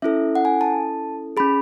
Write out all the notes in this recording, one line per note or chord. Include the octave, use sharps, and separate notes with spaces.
C#4 E4 A4 E5
F#5
G#5
A5
C#4 G#4 B5